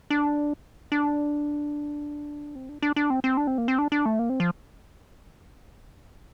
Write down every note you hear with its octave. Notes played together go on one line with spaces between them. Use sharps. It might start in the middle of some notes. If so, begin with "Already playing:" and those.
D4
D4
C4
D4
D4
D4
C4
C4
D4
C4
A#3
C4
D4
D4
A3
A#3
C4
F3